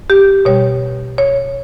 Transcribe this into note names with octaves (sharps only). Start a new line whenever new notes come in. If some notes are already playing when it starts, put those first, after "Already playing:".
G4
B2 G3 C#5
C#5